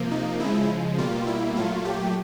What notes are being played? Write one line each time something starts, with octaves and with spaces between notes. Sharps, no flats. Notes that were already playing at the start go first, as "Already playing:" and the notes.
Already playing: C3 F3 A#3
D#4
C#3 F3 G#3 E4
B2 G3 A#3 F4
E4
A#2 F#3 A3 F4
G4